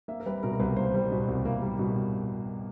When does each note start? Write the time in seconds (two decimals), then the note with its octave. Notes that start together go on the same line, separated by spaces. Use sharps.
0.08 A#3 E5
0.20 A#4
0.26 G3 B4
0.43 B2 A#4
0.53 A#4
0.59 C2 B4
0.76 A#3 C5
0.94 G3
1.12 B2
1.29 C2
1.45 A#3
1.62 G3
1.79 B2